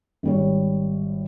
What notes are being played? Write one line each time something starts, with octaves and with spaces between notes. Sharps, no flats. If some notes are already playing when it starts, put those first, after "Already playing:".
G#1 G3 C#5